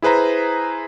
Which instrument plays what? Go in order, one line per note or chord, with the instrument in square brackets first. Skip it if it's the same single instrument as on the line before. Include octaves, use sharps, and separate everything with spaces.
[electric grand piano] E4 G#4 B4 C5 A#5